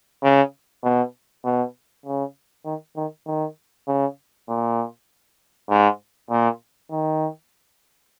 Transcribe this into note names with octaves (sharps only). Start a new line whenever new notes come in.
C#3
B2
B2
C#3
D#3
D#3
D#3
C#3
A#2
G#2
A#2
D#3